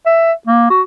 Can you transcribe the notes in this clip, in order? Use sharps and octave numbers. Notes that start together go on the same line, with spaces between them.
E5
A#3
F#4